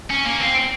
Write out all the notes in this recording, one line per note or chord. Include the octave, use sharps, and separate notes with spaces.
C#4
A#3
C4